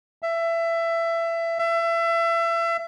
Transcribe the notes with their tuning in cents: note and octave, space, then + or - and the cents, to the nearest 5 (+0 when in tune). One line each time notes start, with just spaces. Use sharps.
E5 +20
E5 +30